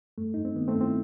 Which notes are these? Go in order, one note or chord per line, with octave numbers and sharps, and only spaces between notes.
G2 A3
G2 D#4
C4
D#3 B3
A3 C4
G2
C4 E4